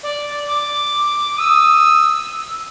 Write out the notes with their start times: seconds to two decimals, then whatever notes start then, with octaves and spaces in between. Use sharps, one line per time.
0.03 D5
0.47 D6
1.39 D#6 E6